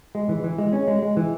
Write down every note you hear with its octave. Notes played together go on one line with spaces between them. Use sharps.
G#3
E3
E3
G#3
C#4
G#3
G#3
E3